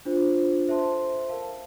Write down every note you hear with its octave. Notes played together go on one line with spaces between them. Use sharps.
D4 F4 C5
A4 C5 E5 A5 C6
A#4 F5 A5